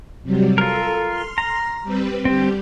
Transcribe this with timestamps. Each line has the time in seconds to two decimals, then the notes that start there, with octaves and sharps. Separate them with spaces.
0.23 C3 F#3 G3
0.58 F4 A4 A#4
1.07 C6 F6
1.38 A#5
1.83 G3 C4 B4
2.25 D3 G3 C4 G4